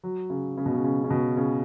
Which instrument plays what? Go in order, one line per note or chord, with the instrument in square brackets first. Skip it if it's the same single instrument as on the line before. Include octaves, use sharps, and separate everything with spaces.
[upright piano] F#3
C#3
C#3
B2
C#3
C#3
C#3
B2
C#3